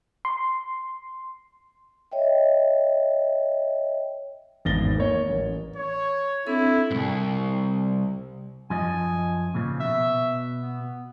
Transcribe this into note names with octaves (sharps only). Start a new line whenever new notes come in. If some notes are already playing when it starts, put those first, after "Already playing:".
C6
C#5 D#5 E5 G5
G#1 E2 A6 A#6 G7
A#3 C#5
A1
C#5
C4 D4 E4 A4
C2 G#2
F#2 F3 D#5 G#5
A#2 C#3 F3
B2 E5
B3